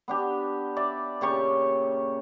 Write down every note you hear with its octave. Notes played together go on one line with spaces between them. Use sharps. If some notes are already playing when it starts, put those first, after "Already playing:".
B3 D4 G4
D5 E5
A#2 C#3 G4 C#6